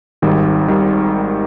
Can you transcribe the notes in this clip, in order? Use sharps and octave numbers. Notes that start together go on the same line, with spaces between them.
G#1 G#2 D#3 G3
D#3 G3